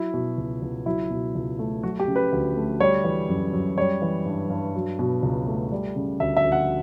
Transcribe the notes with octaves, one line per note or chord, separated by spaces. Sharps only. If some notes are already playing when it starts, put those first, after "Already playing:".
Already playing: F#3 E4
B2
C#2
C#2
F#3 E4
B2
C#2
A3
F#3 F#4
G4
C#3
B4
D2
A3
G3 C#5
E3
F#2
F#2
G3 C#5
E3
G2
G2
F#3
B2
C#2
A3
G3
C#3
D2 E5
E5
D2
F#5